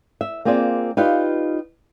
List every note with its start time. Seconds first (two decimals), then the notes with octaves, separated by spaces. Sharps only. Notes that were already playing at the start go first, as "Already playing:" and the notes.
0.21 E5
0.45 A#3 C4 F4 G#4 D5
0.97 D#4 F4 G4 B4 D5 F5